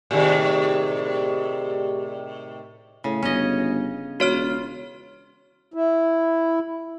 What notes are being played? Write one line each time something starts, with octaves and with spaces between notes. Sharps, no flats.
A2 C3 D#3 G4 G#4 D5
A2 C#3
G1 C#4 D#5
E1 F4 F#4 C#5 F6
E4